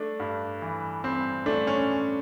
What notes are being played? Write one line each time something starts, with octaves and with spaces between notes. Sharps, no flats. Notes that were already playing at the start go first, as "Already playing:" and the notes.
Already playing: A3 D4
G2
E3
C4
A3 D4
C#4